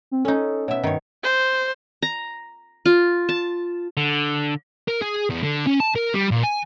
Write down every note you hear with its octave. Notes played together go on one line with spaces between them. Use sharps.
C4
C#4 D#4 A4
B2 C#5 E5
G2 D#3 C#5
C5
A#5
F4
A5
D3
A#4
G#4
E2
D3
C#4
A5
A#4
G3
A#2
G#5